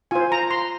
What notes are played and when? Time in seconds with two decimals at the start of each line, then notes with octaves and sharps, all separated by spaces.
0.11 F4 C5 G#5
0.32 A#5
0.51 C6